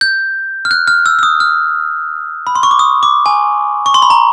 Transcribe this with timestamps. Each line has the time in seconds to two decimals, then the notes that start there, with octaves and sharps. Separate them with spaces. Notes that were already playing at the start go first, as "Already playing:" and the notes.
0.01 G6
0.65 F6
0.71 F#6
0.88 F6
1.06 E6
1.19 E6
1.23 D#6
1.40 F6
2.47 B5
2.55 C6
2.63 C#6
2.71 D6
2.79 D#6
3.03 D6
3.26 G#5
3.86 C#6
3.94 C6
4.02 B5
4.10 A#5